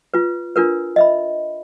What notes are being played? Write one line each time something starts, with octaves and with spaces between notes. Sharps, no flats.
F4 B4
D4 F4 A#4 B4
D#5 E5 B5